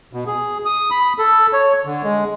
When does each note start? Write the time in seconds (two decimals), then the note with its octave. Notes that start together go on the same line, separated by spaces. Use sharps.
0.13 B2
0.27 G#4
0.65 D#6
0.91 B5
1.19 A4
1.53 C#5
1.85 D3
2.03 G#3